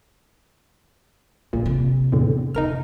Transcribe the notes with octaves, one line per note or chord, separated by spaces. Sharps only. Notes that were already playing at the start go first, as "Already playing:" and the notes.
A#1 A#2
C3
E2 A2 D3
F1 D#4 A#4 F6